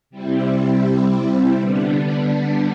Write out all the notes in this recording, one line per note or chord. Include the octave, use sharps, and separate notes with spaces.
C3 G3 C4 E4
D3 G3 B3 D4